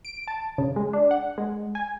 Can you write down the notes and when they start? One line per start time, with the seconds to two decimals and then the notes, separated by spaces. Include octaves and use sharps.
0.05 D7
0.28 A5
0.58 C#3
0.76 G#3
0.93 D4
1.11 F#5
1.38 G#3
1.75 G#5